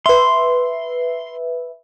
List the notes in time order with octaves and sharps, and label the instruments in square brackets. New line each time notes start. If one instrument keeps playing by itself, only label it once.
[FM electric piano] B4 E5 [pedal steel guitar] C6